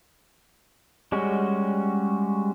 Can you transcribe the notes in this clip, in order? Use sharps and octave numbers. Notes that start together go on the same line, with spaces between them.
G3 G#3 C#4 F#4